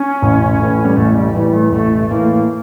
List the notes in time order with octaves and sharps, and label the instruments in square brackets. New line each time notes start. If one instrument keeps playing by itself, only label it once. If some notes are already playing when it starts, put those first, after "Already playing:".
Already playing: [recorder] C#4
[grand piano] A1
A2 E3
[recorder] G3
[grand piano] A1 [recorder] A3
[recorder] G3
[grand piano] A2 E3 [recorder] G3
[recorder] A3
[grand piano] A1 [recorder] A3
[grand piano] A2 E3 [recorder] A#3